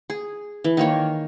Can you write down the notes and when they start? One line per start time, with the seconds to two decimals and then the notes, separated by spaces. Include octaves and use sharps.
0.10 G#4
0.64 E3
0.77 D#3 A#3 C#5